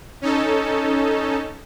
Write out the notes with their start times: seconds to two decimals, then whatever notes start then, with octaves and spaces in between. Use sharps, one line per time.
0.22 C#4 D#4 A4